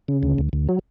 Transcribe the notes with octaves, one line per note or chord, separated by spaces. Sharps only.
C#3
D2
D2
D2
F#3